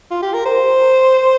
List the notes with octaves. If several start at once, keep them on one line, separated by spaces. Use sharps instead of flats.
F4
G4
A#4
C5